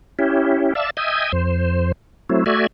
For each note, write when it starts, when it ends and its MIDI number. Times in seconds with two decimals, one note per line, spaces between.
0.19 0.73 61
0.19 0.73 64
0.19 0.73 67
0.75 0.90 74
0.75 0.90 76
0.75 0.90 77
0.75 0.90 81
0.75 0.90 88
0.97 1.32 75
0.97 1.32 76
0.97 1.32 79
0.97 1.32 80
0.97 1.32 87
1.32 1.92 41
1.32 1.92 72
2.30 2.44 54
2.30 2.44 57
2.30 2.44 60
2.30 2.44 64
2.46 2.67 57
2.46 2.67 66
2.46 2.67 74
2.46 2.67 76
2.46 2.67 80